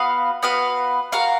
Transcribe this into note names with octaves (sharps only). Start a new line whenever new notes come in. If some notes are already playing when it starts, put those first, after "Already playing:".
Already playing: B3 F#4 B4 F5
B3 F#4 B4 F5
F#4 A#4 F5